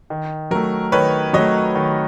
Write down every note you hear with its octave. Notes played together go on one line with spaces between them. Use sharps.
D#3
F#3 A3 A#4
D#3 B4 C#5
F#3 A3 C#5 D#5
D#3